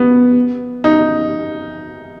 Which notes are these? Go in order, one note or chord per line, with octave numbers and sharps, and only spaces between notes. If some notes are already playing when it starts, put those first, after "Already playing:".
Already playing: B3
D#4